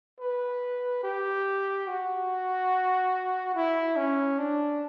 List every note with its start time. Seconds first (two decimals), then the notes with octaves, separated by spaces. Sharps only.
0.20 B4
1.03 G4
1.87 F#4
3.55 E4
3.97 C#4
4.38 D4